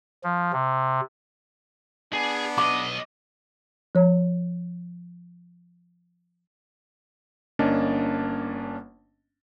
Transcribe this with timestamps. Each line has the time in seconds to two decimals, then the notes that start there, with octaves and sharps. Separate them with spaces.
0.24 F3
0.53 C3
2.13 B3 D4 G#4
2.58 B1 D#5 D6
3.95 F3 C#5
7.59 G1 A#3 C#4 D4 D#5 A5